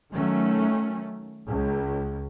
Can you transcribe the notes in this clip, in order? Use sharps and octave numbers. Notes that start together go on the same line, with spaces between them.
D#3 F#3 A3 C#4
C#2